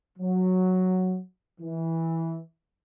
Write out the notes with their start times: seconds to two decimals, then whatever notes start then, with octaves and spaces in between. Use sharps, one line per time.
0.18 F#3
1.60 E3